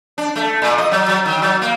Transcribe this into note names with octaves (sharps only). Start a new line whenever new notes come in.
D4
A3
A#2
D#5
F#3
F#3
D#3
F#3
A#3